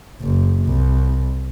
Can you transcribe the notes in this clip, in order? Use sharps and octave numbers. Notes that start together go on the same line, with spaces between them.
F#1
C2